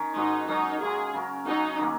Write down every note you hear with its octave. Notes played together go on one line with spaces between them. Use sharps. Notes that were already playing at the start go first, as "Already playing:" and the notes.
Already playing: D#3 C#4
G#2 G#3 D#4 F#4
F#2 F#3 C#4 D#4 A#4
C#3 G#3 C#4 G#4 A#4
C#3 F#3 C#4 A#4
F#3 C#4 D#4 F#4
D#3 F#3 A#3